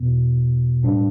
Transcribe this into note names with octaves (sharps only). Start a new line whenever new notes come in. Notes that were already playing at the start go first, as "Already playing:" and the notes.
Already playing: E2 B2 B3
A2 G3 D4